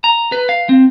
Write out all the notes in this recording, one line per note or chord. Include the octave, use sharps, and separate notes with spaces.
A#5
B4
F5
C4